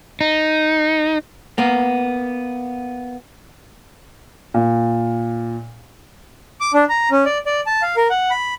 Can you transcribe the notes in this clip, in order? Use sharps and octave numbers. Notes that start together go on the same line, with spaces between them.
D#4
A#3 B3
A#2
D6
D4
A#5
C#4
D5
D5
A5
F5
A#4
F#5
B5